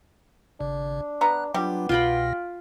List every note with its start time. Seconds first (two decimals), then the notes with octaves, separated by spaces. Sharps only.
0.60 G#1 C#3 D4
1.21 B3 A#5 F#6
1.54 F#3 G3 B3 D4 F4 G4
1.89 C2 B2 F4 G5 B5 A#6